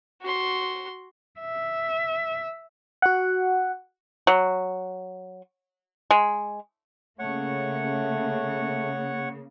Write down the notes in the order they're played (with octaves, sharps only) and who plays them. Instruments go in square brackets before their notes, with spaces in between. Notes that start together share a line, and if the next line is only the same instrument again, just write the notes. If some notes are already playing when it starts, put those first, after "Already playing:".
[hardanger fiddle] F#4 C6
[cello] E5
[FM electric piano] F#4 F#5
[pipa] F#3
G#3
[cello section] C#3 A#3 [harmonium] A3 [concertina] C#5 F#5 C#6